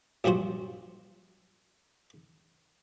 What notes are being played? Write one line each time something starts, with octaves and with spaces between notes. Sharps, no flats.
A#1 G2 F3 F#4 C5